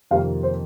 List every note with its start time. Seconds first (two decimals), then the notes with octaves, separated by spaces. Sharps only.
0.11 F2 C3 D#3 A#3 F5
0.43 C5